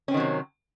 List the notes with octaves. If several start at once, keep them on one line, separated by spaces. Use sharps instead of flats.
C3 D#3 F#3 C4 C#4